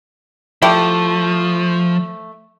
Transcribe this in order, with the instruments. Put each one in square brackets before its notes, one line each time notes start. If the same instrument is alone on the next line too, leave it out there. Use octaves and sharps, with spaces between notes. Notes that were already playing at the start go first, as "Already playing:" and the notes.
[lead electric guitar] F3 [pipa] A3 E4 G4